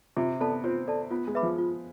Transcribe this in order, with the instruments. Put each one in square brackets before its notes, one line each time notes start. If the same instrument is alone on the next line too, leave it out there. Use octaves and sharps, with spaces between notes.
[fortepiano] C3 [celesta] F4
[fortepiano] B3 [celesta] A4 D5 A5
[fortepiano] C4 [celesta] F4
[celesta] A4 D5 A5
[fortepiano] B3 [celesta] F4
[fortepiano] G#3
[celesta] B4 E5 B5 D6
[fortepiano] F3
[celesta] F4